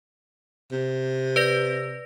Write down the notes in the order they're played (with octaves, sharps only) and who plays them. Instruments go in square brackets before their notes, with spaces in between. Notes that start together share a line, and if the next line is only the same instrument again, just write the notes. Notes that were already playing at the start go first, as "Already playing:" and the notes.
[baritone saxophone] C3
[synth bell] B4 D5 A#6